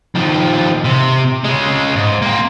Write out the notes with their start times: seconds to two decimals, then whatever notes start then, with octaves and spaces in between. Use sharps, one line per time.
0.16 D#2 F3
0.85 C3
1.45 C#3 G#3
1.96 G#2
2.22 A#3 C4